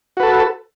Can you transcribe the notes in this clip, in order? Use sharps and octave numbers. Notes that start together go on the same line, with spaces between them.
F#4 A4 B4